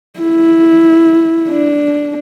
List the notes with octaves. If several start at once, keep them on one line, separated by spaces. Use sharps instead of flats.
E4
D4